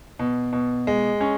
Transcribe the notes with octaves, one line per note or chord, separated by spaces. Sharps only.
B2
B2
G#3
C#4